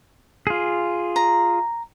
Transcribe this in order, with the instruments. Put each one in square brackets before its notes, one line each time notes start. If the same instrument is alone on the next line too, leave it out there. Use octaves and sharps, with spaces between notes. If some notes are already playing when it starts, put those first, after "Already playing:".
[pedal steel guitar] F4 G#4
[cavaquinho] A#5